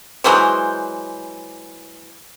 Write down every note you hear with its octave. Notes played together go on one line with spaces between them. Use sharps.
E3 F#3 G#3 C5